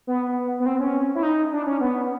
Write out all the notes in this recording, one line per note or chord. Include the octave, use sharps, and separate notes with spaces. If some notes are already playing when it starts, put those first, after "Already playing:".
B3
B3
C4
C#4
E4
D#4
D4
C#4
B3